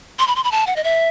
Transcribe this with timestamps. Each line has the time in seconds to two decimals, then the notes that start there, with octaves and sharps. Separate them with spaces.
0.19 C6
0.27 B5
0.36 C6
0.44 B5
0.52 A5
0.67 F#5
0.76 D#5
0.84 E5